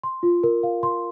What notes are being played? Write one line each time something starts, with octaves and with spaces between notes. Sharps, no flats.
C6
F4
A#4
F5
C6